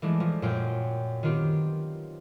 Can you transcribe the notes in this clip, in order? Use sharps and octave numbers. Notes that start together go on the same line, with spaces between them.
E3 F3 G#3 A3 D4 E4
F3
F#2 A#2 F4 F#4 G5 G6
D#3 B3 C4 F4 G4